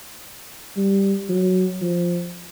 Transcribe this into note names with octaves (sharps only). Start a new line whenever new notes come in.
G3
F#3
F3